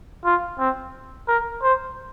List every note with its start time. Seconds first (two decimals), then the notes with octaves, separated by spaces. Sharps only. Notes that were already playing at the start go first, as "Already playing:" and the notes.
0.25 F4
0.59 C4
1.28 A#4
1.63 C5